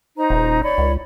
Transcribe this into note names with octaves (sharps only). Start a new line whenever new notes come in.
D#4 C5 A#5
D#1
C#5 D5 B5
C#2